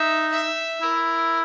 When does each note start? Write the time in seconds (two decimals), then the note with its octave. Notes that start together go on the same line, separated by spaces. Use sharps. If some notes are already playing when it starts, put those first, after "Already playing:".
Already playing: D#4 E5
0.32 E5
0.82 E4 A#4